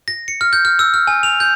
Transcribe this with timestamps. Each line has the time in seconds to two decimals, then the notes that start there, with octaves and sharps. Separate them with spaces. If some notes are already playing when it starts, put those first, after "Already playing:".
0.08 A#6
0.28 C#7
0.41 F6
0.53 G6
0.65 F6
0.79 E6
0.94 F6
1.07 G#5
1.23 F7
1.40 G6